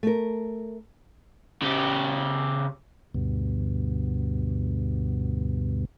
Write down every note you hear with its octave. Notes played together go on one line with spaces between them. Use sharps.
A3 A#4
C#3 G4
D2 G2 B2